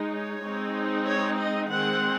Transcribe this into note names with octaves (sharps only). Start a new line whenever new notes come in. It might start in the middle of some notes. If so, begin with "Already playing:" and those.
Already playing: G#3 D#4
C#5
G#3 C4 D#4
C#5
D#5
D#3 G#3 C4 F#5